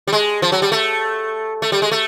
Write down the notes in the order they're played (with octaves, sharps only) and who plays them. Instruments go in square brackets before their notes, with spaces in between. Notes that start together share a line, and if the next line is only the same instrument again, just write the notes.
[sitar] G3
G#3
F3
F#3
G3
A3
A3
G3
G#3
A3